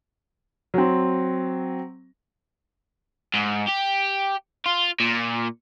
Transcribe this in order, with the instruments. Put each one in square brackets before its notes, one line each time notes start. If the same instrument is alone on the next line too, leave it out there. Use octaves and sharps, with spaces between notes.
[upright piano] F#3 C4
[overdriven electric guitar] G#2
G4
F4
A#2